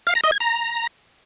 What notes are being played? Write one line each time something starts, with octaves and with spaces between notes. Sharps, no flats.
F5
A#5
D#5
G#6
A#5